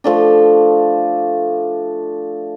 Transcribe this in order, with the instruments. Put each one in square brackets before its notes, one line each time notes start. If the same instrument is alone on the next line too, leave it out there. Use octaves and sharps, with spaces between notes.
[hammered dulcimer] F3 A3 D4